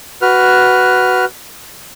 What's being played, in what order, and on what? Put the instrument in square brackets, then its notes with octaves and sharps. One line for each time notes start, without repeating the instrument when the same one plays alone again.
[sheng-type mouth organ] F#4 B4 F6